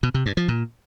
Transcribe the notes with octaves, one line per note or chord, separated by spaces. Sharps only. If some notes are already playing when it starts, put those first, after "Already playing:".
B2
C3
G2
F3
A#2